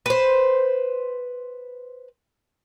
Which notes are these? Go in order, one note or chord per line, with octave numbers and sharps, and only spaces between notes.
B4 C5